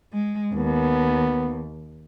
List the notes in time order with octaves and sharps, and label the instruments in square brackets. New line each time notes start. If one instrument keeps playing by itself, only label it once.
[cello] G#3
[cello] D#2 [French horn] B3